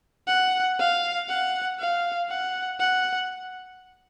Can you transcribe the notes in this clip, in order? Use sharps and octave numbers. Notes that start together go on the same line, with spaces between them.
F#5
F5
F#5
F5
F#5
F#5